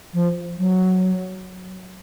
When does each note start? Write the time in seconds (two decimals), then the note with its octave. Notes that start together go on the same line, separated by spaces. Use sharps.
0.14 F3
0.58 F#3